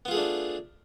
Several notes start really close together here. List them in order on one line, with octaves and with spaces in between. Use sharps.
B3 F4 G#4 A3 D4